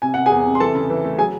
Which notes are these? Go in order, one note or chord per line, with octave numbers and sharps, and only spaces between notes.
C3 G#5
C3 F#5
G#4 G#5
E2
C3
C6
E3 A4 A5
C#3
E3
A3
F#3 G#4 G#5